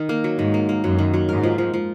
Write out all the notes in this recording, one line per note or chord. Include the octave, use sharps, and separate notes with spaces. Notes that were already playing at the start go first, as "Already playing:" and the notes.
Already playing: D#3
A#3
F#3
G#2 D#3
A#3
A#3
F#2 F#3
D#3
F#3
G#2 A#4
F3
F3
F3